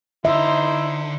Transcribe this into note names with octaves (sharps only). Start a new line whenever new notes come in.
D3 D#4 E4 C5 E5